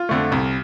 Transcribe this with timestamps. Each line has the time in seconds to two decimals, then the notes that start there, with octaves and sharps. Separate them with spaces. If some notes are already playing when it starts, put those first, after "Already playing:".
Already playing: F4
0.09 F2 D3 A3
0.32 C2